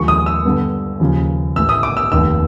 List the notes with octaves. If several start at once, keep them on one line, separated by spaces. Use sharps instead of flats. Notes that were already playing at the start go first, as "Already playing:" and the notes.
Already playing: D#2 D3 F3 G#3 C#6
D#6
E6
G2 D3 G3 B3
D#2 C#3 F3 A#3
A1 A2 E3 E6
D#6
D6
E6
F1 D#2 D#3 E6